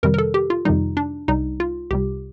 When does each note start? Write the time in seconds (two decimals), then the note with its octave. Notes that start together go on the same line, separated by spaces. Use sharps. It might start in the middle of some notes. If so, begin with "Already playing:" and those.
0.03 F2 C3 D#3 G3 A#4
0.14 A#4
0.18 A4
0.34 G4
0.50 F4
0.65 F2 C3 D#3 G3 D#4
0.97 D4
1.28 C2 C3 G3 D#4
1.60 F4
1.91 C2 C3 G3 G4